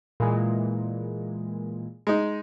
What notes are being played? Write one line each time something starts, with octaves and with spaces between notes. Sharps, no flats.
A#2 E3 G#3
G#3 D#4